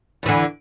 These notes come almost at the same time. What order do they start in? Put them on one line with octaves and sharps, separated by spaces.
E2 E3 D3